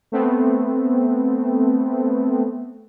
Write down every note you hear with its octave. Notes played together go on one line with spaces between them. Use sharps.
A3 B3 C4